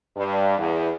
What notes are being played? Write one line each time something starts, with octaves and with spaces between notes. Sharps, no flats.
G2
E2